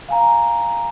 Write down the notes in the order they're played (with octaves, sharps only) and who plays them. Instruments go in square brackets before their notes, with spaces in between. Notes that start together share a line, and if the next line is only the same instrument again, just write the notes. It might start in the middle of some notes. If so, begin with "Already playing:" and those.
[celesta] F5 G#5 A#5